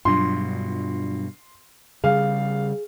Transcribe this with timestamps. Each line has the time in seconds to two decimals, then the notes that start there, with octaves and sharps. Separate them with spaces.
0.05 G2 B2 F#3 D4 F4 C6
2.04 C#3 G3 G#4 F5